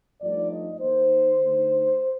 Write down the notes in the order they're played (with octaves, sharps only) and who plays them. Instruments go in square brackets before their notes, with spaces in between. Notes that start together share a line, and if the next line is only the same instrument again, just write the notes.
[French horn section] G2 F3 A3 D#4 D5
D#5
D#3 A#3 D#4 C5
D3 A3 D#4